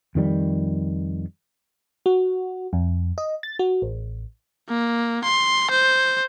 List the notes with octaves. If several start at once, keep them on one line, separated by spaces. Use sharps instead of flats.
F2 D#3 G3
F#4
F2
D#5
A6
F#4
A1
A#3
C6
C5